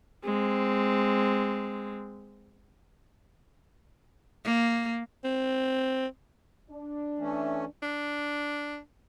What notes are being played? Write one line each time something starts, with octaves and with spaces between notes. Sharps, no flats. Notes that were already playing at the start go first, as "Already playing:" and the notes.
G#3 C4
A#3
C4
D4
E3 A3 C#4
D4